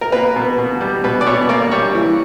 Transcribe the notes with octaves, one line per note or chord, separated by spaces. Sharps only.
A#4
A#3 B4
B2
B2
G3
B2 B4
D5
B2 C#5
A#3 D5
G3 C#5
E3